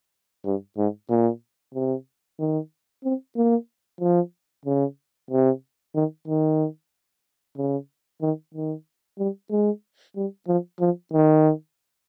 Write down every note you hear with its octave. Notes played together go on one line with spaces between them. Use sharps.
G2
G#2
A#2
C3
D#3
C4
A#3
F3
C#3
C3
D#3
D#3
C#3
D#3
D#3
G3
G#3
G3
F3
F3
D#3